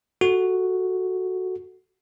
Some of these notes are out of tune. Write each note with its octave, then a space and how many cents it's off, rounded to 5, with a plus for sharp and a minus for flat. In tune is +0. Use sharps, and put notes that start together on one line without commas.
F#4 +0 A4 +0